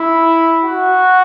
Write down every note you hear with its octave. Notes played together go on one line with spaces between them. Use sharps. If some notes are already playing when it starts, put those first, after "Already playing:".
Already playing: E4
F#4